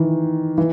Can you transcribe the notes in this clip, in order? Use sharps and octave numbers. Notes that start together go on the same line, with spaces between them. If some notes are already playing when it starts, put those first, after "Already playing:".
Already playing: D#3 E3
E3